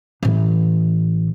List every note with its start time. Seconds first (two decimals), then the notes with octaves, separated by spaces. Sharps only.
0.23 A1 E3